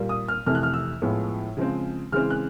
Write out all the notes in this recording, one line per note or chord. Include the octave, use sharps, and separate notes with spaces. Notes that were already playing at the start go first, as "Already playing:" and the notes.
Already playing: A#2 G3 A#3
D#6
F6
F2 C3 E3 A3 F6
F#6
F6
E6
A2 F3 G#3 B3
C#3 F3 G#3 C4
C#3 E3 G#3 C4 F6
F#6